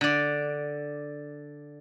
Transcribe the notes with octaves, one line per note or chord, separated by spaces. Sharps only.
D3 D5